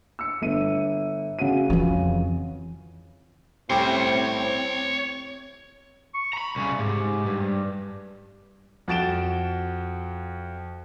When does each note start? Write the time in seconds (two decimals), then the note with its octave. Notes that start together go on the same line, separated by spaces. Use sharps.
0.19 E6 C#7
0.42 G1 D#7
1.39 C#3 F#4 D#7
1.70 F2 E3
3.70 A2 G3 C4 C#4 C#5 C6
6.14 C#6
6.33 A#5 B5
6.56 C2 C#3
6.79 G#2 G4
7.26 G2
8.88 F2 F#4 A6 D7 E7 G7